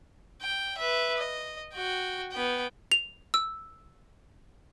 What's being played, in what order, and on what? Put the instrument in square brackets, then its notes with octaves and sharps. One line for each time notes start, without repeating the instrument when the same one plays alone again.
[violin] G5
B4 E5
D#5
F#4 G5
B3 G5
[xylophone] F7
E6